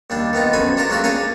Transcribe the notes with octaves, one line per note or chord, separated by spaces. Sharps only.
D#2 G3 D4
D#3 B3 D#4 F4
F#2 C4 A4 G#5 B5
D4 F4 A4 A#4 A#5
C#3 F#3 A3 F#4 G4 A4
D4 G#4 A#4 C#5 F5 G#5